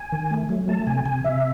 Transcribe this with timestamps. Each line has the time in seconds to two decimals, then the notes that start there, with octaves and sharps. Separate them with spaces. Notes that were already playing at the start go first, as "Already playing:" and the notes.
Already playing: G#5
0.12 D#3
0.31 A3
0.49 F#3
0.68 A3 A5
0.87 C3 G#5
1.06 C3 G#5
1.25 C3 E5